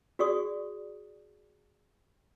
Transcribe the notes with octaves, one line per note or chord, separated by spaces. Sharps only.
F#4 G#4 D5 C#6 D#6